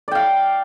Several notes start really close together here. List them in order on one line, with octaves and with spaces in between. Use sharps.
D5 G5 F5